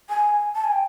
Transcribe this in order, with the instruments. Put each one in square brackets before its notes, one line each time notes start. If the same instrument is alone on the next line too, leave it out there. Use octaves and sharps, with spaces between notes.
[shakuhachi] G#5
A5
G#5
G5